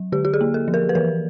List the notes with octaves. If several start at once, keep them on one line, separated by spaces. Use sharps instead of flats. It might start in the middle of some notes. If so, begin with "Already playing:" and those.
Already playing: F#3
D3 G4
G4
G#4
A#3
A4
F3
A#4
B4
E3 A#4